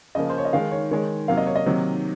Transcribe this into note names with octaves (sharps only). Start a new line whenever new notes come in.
C#3 F3 A#3 D#5
C5
C#5
D#5
D#3 G#3 F5
C#5
D#3 G#3 C#5
C3 F#3 A#3 F5
D#5
C#5
D#5
C3 D#3 F#3 A#3